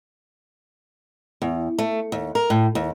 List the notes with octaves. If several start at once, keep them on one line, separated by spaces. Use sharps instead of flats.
E2
A3
D#2
A#4
A2
D#2